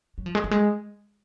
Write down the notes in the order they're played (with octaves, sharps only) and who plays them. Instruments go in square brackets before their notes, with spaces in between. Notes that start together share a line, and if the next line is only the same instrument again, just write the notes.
[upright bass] F#3
F3
G#3
F#3
G#3